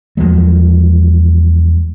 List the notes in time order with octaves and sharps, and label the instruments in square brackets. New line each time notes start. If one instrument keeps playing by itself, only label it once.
[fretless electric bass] E2 F3 F#3 G#3